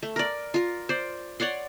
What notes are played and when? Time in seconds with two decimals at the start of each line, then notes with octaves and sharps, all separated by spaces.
0.03 A3
0.16 A#4 D5
0.54 F4 A#4
0.89 C5 D5
1.40 C#5 D5 F#5 C6